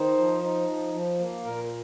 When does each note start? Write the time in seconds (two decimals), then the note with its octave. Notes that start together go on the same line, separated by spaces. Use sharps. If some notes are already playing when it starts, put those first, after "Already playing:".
Already playing: D#3 D#4 C5
0.18 F3
0.43 D#4
0.69 F3
0.94 F3
1.19 A#3
1.44 A#2 A#4